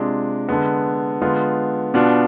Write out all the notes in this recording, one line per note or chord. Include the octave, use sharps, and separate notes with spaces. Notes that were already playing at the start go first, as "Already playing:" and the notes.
Already playing: C3 G#3 D4 F4
D3 G#3 B3
D3 G#3 B3 F4
B2 B3 D4 F4